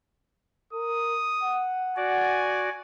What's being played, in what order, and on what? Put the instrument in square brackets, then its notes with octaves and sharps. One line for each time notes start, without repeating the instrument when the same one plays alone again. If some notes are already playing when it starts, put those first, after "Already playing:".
[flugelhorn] A#4 [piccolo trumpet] D#6
[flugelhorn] F#5
[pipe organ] F#4 D5 [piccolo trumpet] G#5